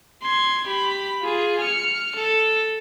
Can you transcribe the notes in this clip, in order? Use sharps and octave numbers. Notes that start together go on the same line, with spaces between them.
C6 G#6
G4 B5
F4 G#4
F6 C#7
A4